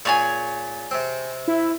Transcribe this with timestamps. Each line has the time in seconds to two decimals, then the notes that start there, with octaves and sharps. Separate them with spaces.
0.05 A#2 G#4 C#5 G#5
0.91 C3 C4
1.48 E4